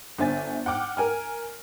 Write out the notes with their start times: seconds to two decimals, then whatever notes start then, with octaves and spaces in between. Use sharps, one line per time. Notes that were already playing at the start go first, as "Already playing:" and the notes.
0.18 G1 D4 C5 E5 G#5 A6
0.66 F#5 G5 D6 F6
0.97 A#4 G#5 F6